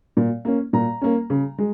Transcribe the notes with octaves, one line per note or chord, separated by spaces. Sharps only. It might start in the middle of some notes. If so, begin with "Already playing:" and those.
A#2
A#3 C#4
A#2 A#5
A#3 C#4
C#3
G#3